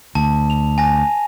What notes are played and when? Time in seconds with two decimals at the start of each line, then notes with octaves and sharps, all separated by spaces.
0.15 D2 A5
0.50 F7
0.78 G#5 A#6